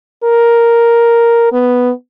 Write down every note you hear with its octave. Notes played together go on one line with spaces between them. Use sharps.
A#4
B3